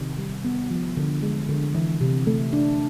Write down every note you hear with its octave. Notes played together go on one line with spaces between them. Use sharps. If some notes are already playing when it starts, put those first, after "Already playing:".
Already playing: C3 D#3
G3
B3
F3
D3
G#3
D3
E3
C3
A3
D4